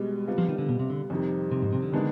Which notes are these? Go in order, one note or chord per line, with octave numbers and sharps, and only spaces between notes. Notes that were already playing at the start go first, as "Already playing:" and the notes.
Already playing: B2 G3 G#3 B3
C3 G3 B3 F4
F3
D#3
D3
B2
C3
D3
F2 C3 D#3 G3
C3
G#2
C3
D3
D#3 G#3 B3 D4